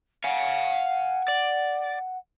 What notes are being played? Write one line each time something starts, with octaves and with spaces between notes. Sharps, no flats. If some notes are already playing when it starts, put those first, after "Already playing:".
F5 F#5 G#5
D5